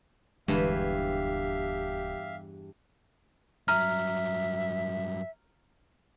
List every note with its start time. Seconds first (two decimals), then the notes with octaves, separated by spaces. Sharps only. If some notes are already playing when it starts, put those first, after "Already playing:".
0.48 D1 E2 G2 D3 G#3 G4 E5 F5
3.68 G2 F#3 E5 A#5 F6